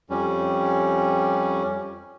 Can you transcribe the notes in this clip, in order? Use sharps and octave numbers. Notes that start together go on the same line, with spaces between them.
F2 G3 C#4